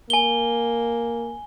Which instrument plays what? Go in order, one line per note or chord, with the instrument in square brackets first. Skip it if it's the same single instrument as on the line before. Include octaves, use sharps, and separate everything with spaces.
[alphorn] A#3 [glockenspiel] G#5 G7